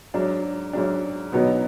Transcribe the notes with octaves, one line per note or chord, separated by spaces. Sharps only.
G#2 F#3 D4
G#2 F#3 D4
B2 F#3 B3 D#4